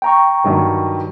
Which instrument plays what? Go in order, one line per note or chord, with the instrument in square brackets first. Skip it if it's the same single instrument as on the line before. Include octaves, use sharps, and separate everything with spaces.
[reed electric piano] G5 A#5 C#6
[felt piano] G2 D#3 F#3